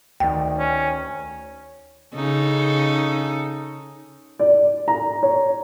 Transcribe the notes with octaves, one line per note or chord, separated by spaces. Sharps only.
D2 D#3 D5 G5 A6
C#4
C#3 D#4 A4
D5
A#5
C#5